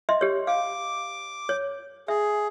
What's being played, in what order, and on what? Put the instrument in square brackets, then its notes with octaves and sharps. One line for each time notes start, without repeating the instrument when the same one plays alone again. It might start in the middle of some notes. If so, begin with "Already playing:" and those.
[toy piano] D#5 E5 C6
G4 C#5
[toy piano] F5 [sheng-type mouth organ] D6
[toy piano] C#5
[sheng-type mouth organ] G#4 [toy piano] E5